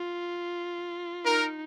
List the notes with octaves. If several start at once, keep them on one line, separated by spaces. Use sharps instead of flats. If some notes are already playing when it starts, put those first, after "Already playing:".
Already playing: F4
D#4 A#4